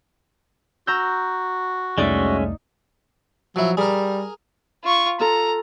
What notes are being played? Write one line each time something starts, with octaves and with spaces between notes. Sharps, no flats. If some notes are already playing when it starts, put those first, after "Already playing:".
F#4 A#5 E6 G6
C2 F2 G#3 A3 C#4 D#4 D5 E5
F3 F#3 E4
G3 G#4 A#4
F4 C#6
F4 A4 A#5